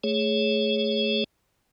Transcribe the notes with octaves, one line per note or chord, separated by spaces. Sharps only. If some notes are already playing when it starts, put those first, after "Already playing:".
A3 G#4 C#5